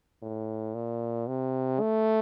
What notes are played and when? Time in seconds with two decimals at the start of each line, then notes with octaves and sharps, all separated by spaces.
0.22 A2
0.75 A#2
1.28 C3
1.80 A3